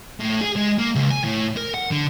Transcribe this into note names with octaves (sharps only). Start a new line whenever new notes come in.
A2
G#4
G#3
A#3
C#2
G#5
A2
A#4
F#5
D3